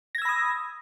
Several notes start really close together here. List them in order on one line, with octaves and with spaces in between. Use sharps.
A#6 G#6 E6 B5 D#6